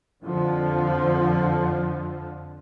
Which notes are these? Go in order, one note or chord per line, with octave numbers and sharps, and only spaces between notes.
F2 D3 F3